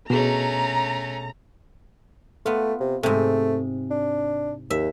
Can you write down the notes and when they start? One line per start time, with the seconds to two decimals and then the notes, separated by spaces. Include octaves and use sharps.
0.10 B2 A3 C#4 D4 G#4 A#5
2.46 A3 B3 F4
2.80 C3
3.03 G#2 C3 A3
3.91 D4
4.70 D#2 E5